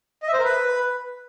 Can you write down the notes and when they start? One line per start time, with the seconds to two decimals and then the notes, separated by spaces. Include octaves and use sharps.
0.23 D#5
0.28 E5
0.34 C5
0.39 A#4
0.44 B4